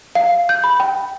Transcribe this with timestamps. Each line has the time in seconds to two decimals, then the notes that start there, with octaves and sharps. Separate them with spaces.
0.15 F5
0.49 G6
0.64 B5
0.80 G5